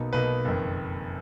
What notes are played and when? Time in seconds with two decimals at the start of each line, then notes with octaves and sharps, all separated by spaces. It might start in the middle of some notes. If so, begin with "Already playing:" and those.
Already playing: B1 B2 A#3 D#4
0.13 B1 B2 A#3 D#4 B4
0.45 F#1 F2 D#3